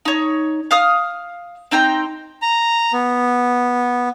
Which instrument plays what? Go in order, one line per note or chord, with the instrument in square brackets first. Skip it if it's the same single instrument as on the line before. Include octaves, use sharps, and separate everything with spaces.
[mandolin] D#4 C#5
F5 D#6 F6
C4 D#4 G5 A#5
[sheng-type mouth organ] A#5
B3